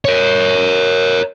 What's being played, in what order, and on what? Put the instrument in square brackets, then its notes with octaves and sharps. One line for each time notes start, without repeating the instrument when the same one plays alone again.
[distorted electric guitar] A#4 C#5